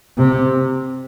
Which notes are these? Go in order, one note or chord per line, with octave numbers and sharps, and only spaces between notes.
C3